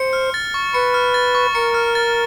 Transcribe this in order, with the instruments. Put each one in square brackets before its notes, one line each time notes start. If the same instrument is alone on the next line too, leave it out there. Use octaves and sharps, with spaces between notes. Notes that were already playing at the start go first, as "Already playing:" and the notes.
Already playing: [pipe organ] C5 [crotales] C#7
[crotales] F6
A6
C#6
[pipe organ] B4 [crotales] C#7
[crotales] F6
A6
C#6
[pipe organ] A#4 [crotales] C#7
[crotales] F6
A6